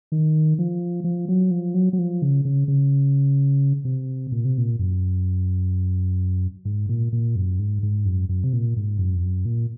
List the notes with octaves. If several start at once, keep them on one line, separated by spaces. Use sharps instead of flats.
D#3
F3
F3
F#3
F3
F#3
F#3
F3
C#3
C#3
C#3
C3
A#2
C3
A#2
F#2
G#2
A#2
A#2
F#2
G#2
G#2
F#2
F#2
C3
A#2
G#2
F#2
F2
F#2
A#2